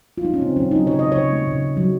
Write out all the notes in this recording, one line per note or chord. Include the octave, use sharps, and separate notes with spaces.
F4
D#4
C#4
C#3 C4
F#3 C#4
F#3 D#4
C#3 C#5
C#3 D#5
C#3 C#5
A3
C#3
C#3
F#3